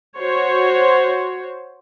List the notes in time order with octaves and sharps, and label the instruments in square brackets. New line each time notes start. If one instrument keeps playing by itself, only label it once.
[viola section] F#4 C5 C#5